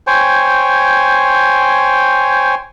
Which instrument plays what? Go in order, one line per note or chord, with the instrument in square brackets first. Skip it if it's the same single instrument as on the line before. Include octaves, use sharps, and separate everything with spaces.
[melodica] C5 C#5 G5 G#5